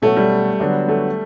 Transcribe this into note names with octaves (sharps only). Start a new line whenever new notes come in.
B2 F#3 A3 C#4 F#4
G3
D3 F#3 B3 D4 F#4
A3